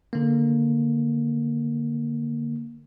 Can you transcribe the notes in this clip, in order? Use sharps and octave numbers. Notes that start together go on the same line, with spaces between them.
D3 A#3